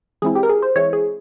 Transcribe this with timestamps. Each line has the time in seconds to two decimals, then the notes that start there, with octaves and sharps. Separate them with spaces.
0.22 E3 G#3 C4 E4 G#4
0.35 G4
0.43 A#4
0.49 G#4
0.62 C5
0.76 E3 G#3 C4 E4 C#5
0.93 G#4